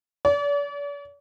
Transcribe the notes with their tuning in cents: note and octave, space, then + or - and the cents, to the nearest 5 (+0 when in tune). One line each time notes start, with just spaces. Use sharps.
D5 -40